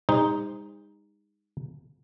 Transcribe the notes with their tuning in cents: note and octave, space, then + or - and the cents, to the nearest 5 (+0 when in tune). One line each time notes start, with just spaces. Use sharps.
G#3 -45 D#4 +0 C5 +0